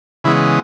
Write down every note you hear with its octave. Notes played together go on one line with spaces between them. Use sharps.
C#3 E3 G#3 B3 E4